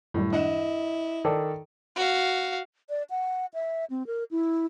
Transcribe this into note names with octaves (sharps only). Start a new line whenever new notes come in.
F#2 A2 D#3 G3
D4 E4 D#5 F#5 E7
D#3 A4 D5
F#4 F5
D5
F#5
E5
C4
A#4
E4